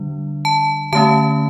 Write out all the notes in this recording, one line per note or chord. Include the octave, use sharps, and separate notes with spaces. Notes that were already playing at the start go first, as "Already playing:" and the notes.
Already playing: D3 G3 D4
A5
D3 A3 C#4 A5